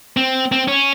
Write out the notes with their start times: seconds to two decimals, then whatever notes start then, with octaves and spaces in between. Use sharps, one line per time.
0.17 C4
0.52 C4
0.68 C#4